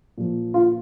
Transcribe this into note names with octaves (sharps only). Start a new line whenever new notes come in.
A#2 F3
F4